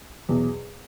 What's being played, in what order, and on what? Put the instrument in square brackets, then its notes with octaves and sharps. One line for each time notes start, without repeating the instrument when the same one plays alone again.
[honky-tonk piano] E2 B2 F#3